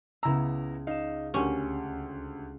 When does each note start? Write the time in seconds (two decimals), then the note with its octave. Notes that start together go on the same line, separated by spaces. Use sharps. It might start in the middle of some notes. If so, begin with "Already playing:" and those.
0.23 C#2 C#3 B3 E4 A#5 E6
0.87 D#4 F5 E7
1.34 D2 C#4 G4